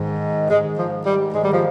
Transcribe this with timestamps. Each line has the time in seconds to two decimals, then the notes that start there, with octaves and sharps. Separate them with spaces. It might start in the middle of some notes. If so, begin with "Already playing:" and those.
Already playing: G#2 D#3
0.50 G#2 D#3 G#3
0.78 F3
1.05 G3
1.34 G#2 D#3 G#3
1.43 G3
1.53 F3